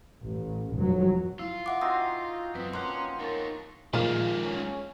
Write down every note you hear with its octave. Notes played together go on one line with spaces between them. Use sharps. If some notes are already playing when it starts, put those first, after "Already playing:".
A1
F1 F#3
E4 F4
E5 F#5 D6
C4 D#4 F#4 D#6
F#2 C4 B4 D#6
F3 A#3 C#4 F#5 C6
D#4 A#4 C#5 C#6 A6
A#2 D#3 F3 G#3 A#3 F4
C#4